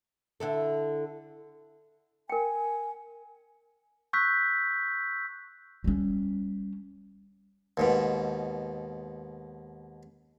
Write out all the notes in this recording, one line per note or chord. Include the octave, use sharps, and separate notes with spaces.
D3 E4 A4
A#4 G5 G#5
C#6 E6 F#6 G6 B6
G3 C#4
D#2 G#2 B2